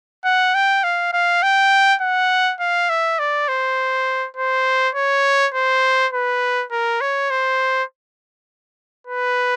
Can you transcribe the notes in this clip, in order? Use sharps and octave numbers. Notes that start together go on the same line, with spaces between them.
F#5
G5
F5
F5
G5
F#5
F5
E5
D5
C5
C5
C#5
C5
B4
A#4
C#5
C5
B4